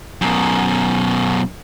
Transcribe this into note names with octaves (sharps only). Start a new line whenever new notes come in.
F#2 B2